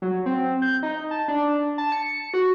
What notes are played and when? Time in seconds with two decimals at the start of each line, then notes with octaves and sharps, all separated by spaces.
0.02 F#3
0.26 C4
0.62 G6
0.83 D#4
1.11 A5
1.28 D4
1.78 A5
1.92 C#7
2.34 F#4